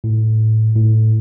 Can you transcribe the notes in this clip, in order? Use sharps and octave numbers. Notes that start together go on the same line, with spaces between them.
A2
A2